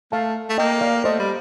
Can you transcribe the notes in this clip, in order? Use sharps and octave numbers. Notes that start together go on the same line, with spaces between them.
A3 F5 A5
A3
A#3 D#5 G5
D5 F5
A3 C5 D#5
G3